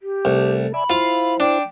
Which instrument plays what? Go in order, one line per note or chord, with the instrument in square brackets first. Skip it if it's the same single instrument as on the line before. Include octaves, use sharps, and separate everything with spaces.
[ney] G4
[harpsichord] C2 [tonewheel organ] A3 A4
[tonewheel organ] D5 E5 G#5 [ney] B5
[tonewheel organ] E4 C5 [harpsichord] F4 F5
[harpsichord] D4 [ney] G5